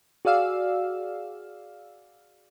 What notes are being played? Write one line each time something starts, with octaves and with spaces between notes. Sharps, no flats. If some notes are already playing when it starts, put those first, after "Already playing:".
F#4 G#4 D5 F5 E6